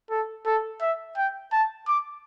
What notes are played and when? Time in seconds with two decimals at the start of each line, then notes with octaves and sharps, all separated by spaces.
0.10 A4
0.46 A4
0.81 E5
1.17 G5
1.52 A5
1.88 D6